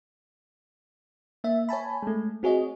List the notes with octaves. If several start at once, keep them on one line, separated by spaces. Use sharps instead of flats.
A#3 E5
C#5 G#5 A5 B5
G#3 A3
C4 F#4 G#4 C#5 D#5